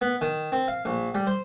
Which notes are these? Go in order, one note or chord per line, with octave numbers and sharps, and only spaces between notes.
B3
D#3
C4
F5
A#1
G3
C5